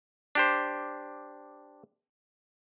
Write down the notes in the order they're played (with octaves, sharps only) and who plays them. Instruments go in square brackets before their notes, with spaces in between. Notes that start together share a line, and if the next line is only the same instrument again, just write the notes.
[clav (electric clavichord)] D4 G4 C5